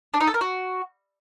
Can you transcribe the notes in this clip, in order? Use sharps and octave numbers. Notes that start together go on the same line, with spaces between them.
D4
D#4
A4
A#4
F#4